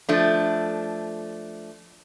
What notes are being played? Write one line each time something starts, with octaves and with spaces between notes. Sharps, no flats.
F3 A3 D4